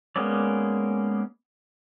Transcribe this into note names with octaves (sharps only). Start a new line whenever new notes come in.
G#3 A#3 B3 C#4 D5